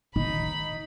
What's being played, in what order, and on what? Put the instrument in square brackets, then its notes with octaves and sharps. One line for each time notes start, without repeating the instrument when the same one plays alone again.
[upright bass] D#3 [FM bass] D#4 [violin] B5